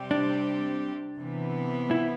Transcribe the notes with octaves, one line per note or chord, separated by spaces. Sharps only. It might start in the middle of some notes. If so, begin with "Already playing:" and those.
Already playing: C3 G3 C4 G4
D4
C3 E3 B3
E4